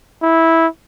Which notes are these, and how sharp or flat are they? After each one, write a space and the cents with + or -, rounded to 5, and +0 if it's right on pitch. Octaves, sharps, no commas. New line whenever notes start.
E4 -10